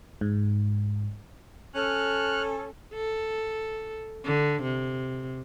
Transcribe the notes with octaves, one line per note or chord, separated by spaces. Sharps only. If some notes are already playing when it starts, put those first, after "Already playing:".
G#2
C#4 A4 F6 F#6
A4
D3
C3